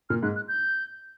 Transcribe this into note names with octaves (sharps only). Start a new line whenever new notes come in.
A#2 F6
G#2 F#6
F#6
G6